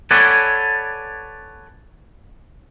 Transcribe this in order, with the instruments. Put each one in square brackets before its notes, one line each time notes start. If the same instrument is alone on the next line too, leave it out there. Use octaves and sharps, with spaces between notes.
[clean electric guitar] A4 B4 C#5 D5 F#5 G#5